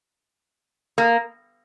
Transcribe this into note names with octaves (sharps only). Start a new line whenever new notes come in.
A#3